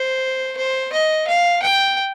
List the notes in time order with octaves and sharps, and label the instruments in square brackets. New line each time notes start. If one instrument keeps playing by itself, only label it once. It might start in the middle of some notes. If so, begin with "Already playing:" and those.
Already playing: [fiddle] C5
C5
D#5
F5
G5